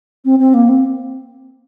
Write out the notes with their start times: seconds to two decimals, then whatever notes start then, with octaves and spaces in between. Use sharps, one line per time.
0.25 C4
0.39 C4
0.54 A#3
0.69 C4